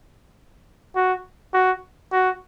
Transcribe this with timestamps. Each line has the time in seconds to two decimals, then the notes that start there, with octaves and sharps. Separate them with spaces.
0.95 F#4
1.54 F#4
2.12 F#4